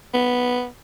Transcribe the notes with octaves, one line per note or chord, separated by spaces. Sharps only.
B3